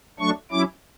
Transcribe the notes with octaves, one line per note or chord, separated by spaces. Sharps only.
F#3 A3 D4 C#6
F#3 C#4 E4 D6